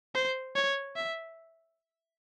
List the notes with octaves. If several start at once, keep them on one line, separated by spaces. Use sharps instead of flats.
C5
C#5
E5